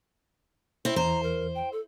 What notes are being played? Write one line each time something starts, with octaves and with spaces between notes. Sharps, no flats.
C4 E4
E2 C5 A#5
A#4
G5
A4